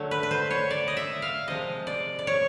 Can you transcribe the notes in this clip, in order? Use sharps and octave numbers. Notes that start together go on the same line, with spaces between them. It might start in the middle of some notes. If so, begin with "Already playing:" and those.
Already playing: D3 F#3 A3
B4
B4
C5
C#5
D5
D#5
E5
F5
C3 F3 G#3 D#5
D5
D5
C#5